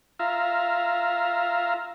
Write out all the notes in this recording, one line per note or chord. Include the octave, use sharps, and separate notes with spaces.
F4 E5 F5 A#5